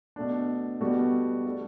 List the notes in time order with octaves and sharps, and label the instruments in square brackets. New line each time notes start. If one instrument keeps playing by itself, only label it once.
[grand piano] B2 A3 D4
B2 G3 B3 F#4 A4
A3 D4 A4